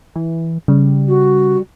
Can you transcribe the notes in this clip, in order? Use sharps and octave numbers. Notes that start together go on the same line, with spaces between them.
E3
C#3 G3
F#4